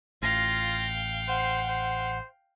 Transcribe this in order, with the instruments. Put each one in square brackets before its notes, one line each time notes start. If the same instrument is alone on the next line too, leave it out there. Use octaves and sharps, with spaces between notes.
[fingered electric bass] A1 [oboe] F4 [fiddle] F5 G5 [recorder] A#6
[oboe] C5 [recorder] F#5
[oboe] C5